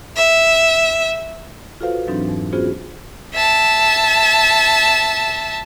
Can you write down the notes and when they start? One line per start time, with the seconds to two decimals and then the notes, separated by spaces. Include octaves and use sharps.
0.16 E5
1.81 F4 F#4 A4 B4 C5 F5
2.08 G#2 E3 F#3 C4 D4 D#4
2.29 F2
2.53 B3 C#4 F4 F#4 G#4 C5
3.35 E5 A5